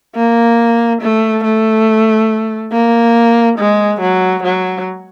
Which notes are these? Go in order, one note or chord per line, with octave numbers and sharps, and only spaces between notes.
A#3
A3
A3
A#3
G#3
F#3
F#3